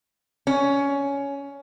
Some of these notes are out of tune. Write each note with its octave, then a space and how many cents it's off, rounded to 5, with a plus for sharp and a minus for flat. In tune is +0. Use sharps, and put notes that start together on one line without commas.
C#4 +15